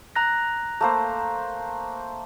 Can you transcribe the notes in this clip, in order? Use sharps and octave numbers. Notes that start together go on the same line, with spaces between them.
A#5 F#6 A#6
A3 A#3 C5